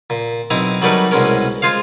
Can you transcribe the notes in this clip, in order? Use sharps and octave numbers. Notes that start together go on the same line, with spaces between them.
A#2
B1 C4 E4 D#5 A#5
F#3 G3 A3 D#4 A#4 B4
C2 B2 G#3 C#4 A#4
G#3 F4 G#4 C5 F5